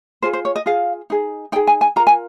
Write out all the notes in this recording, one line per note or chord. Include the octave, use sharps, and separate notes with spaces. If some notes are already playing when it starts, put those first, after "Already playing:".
F4 G#4 C5
C5
C#5
D#5
F4 G#4 F5
D#4 G#4
D#4 G#4 G5
G#5
G#5
F4 A#4 A#5
G#5